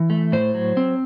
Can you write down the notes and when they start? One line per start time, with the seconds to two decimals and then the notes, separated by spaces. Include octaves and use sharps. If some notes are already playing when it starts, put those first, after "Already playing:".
Already playing: E3
0.10 A3
0.32 A2 C5
0.54 F#3
0.77 C4